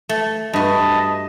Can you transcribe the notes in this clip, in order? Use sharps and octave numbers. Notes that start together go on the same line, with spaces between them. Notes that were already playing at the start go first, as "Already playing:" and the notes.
A3
G2 F#4 D#5 A5 B5